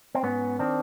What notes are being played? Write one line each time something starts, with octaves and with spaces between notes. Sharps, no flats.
C4
G#2 B3 C#4
D#3 C4 D4